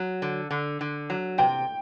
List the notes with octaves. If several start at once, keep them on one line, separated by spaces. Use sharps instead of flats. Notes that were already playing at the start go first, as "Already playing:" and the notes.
Already playing: F#3
D3
D3
D3
F#3
C3 G5